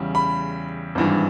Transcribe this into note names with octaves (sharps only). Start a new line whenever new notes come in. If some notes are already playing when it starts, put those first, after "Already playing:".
Already playing: E2 C#3 G3
B5
G#1 G2 E3